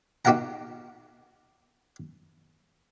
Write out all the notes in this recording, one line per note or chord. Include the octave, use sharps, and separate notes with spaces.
D#4 F#4 G4 F5 F#5 A#5